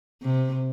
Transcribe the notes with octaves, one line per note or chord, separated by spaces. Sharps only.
C3